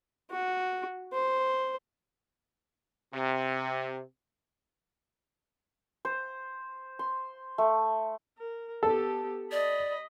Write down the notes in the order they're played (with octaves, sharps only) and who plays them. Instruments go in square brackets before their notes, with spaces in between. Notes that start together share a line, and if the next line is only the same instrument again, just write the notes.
[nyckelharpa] F#4
C5
[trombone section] C3
[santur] C5
C6
A3
[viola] A#4
[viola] B3 G4 [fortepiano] A4
[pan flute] D5 [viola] D#5 B5